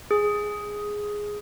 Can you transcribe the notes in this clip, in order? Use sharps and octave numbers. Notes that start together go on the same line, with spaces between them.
G#4